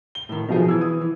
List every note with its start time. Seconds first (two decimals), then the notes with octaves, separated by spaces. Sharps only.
0.15 G7
0.29 A2 D#3
0.49 B2 F3 D#4 G#4
0.68 E3 E6 G#6
0.81 D#6
1.01 E3